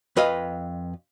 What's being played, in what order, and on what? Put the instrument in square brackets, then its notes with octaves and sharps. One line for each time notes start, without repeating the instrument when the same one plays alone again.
[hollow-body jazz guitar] F2 B4 D#5 F5